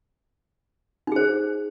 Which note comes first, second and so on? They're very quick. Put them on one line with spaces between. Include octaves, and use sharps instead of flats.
D#4 G#4 C5